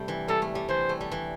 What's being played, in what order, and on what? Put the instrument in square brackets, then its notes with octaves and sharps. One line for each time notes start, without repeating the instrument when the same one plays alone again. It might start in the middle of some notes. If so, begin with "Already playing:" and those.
Already playing: [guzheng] C3 G3 A3
E3
[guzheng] G3 [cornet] A4
[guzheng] A3
G3
[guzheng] E3 [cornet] C5
[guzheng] A3
G3
E3